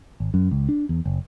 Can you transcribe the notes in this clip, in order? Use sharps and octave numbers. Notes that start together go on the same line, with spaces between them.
G#1
F#2
C#2
D4
E2
F#1